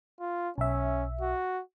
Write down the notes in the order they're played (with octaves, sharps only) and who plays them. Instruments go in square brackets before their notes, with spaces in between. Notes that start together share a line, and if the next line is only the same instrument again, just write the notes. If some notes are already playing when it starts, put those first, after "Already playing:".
[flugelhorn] F4
[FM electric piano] B1 E5 [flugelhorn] C#4
[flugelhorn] F#4